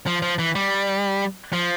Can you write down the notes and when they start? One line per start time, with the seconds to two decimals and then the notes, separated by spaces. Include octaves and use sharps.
0.07 F3
0.22 F3
0.39 E3
0.55 G3
1.53 F3